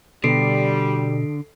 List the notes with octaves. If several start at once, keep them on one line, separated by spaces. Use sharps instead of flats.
B2 D3 G3 A4 C7 D7